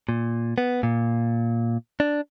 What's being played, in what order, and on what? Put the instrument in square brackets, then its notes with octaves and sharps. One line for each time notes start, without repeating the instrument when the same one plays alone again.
[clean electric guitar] A#2
B3
A#2
D4